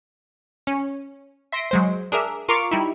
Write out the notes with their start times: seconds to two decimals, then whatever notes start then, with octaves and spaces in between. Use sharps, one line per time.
0.67 C#4
1.52 E5 C6 A#6 C7 D7 D#7
1.71 F#3 G#3 C5
2.12 D4 G#4 A#4 E5
2.49 F4 A#4 F5 C#6 D6
2.71 G3 D#4 E4